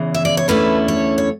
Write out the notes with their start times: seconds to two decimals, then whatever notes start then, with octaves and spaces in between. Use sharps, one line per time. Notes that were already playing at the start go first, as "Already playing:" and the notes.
Already playing: E2 C#3 E3
0.14 E5
0.25 D5
0.37 C#5
0.48 E2 D3 A3 C#4 E4 B4
0.88 C#5
1.18 C#5